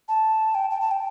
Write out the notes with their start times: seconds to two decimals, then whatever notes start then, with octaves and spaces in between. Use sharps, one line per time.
0.08 A5
0.55 G5
0.70 G5
0.81 A5
0.91 G5